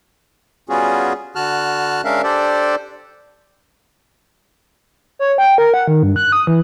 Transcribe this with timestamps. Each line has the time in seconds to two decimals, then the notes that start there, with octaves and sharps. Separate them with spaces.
0.69 G3 B3 C#4 F4 F#4 G#4
1.36 D3 F#4 A5 F6 F#6
2.05 G#3 C#4 D4 A#4 E5 F5
2.24 D4 G4 A4 C5 D5
5.19 C#5
5.38 G5
5.58 A#4
5.74 F#5
5.88 D#3
6.03 G2
6.16 F#6
6.32 D#6
6.47 E3